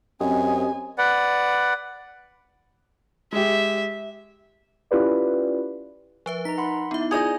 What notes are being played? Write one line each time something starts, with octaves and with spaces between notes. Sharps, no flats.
F#2 C4 G4 D#5 G#5
B4 D5 F#5
G#3 G4 E5
C#4 E4 F4 G4 B4 D5
F3 B4 E5
D#4 A#5 B6
F#5 B5 C6
B3 D#4 E4 E5
F4 G#4 D5 D#5 G6